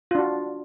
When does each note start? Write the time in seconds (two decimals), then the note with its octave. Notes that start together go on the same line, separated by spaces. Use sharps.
0.11 F4
0.15 D4
0.19 F#4